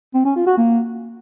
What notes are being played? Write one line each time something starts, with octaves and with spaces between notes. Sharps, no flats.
C4
C#4
F4
F#4
A#3